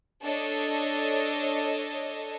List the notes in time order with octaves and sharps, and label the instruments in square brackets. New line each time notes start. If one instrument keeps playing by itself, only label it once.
[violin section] D4 A4 C#5 D#5